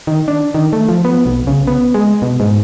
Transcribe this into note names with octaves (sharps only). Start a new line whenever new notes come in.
D#3
D4
D#3
A3
F3
B3
B1
C#3
B3
G#3
B2
G#2